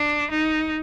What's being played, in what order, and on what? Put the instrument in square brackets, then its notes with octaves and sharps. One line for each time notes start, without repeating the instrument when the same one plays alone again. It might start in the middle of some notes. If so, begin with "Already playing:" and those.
Already playing: [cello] D4
D#4